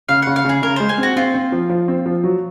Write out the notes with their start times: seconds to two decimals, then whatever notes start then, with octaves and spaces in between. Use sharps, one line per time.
0.09 C#3 F5
0.22 C#3 F#5
0.36 F5
0.45 C#3 G#4
0.62 C#3 A#4
0.76 G#3 C5
0.89 G#4
0.98 C4 F#4
1.16 C4 F4
1.34 C4
1.52 F3
1.69 F3
1.88 C4
2.06 F3
2.24 F#3